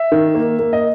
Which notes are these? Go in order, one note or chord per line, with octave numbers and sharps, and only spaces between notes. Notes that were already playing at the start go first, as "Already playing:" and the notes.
Already playing: E5
D#3
A#3
A#3
D#5